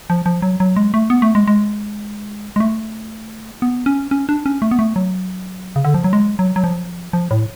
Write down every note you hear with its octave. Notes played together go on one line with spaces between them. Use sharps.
F3
F3
F#3
F#3
G#3
A3
B3
A3
G#3
G#3
G#3
A3
B3
C#4
C#4
D4
C#4
A3
B3
A3
F#3
C#3
D3
F3
F#3
G#3
F#3
F#3
F3
F3
A2